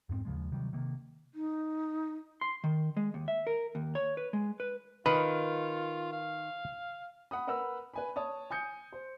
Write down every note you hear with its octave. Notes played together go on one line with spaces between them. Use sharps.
F2 G#2 G#3 C4
D#2 C#3 F3 G#3
C3 D#3 F#3 G3
C3 D#3 A#3
D#4
C6
D#3
G#3
D#2
E5
A#4
D#2
C#5
B4
G#3
B4
D#3 F4 B4
F5
F#5 B5 D#6
A#4 B4 F#5 B5 E6
B4 G#5 B5
C#5 A5 D#6
G#5 D#6 G6 C#7
C5